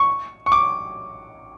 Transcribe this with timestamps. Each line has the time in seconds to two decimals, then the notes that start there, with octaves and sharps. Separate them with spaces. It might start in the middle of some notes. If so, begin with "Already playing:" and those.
Already playing: C#6
0.46 C#6
0.52 D6